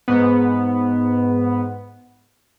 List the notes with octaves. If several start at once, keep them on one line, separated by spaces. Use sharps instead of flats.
G#2 B3